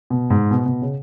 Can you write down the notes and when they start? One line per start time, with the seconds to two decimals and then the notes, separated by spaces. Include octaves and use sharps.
0.10 B2
0.30 G#2
0.51 B2
0.66 B2
0.82 C#3